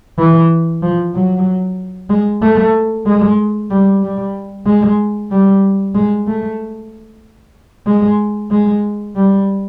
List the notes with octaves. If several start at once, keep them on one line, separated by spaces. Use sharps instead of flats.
E3
F3
F#3
G#3
A3
G#3
G3
G3
G#3
G3
G#3
A3
G#3
G#3
G3